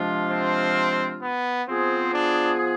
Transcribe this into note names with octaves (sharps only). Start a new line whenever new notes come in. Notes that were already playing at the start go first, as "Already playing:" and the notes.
Already playing: C3 F3 G#3 D4 F4
C4
B3
F3 B3 C4 F4 G#4
D4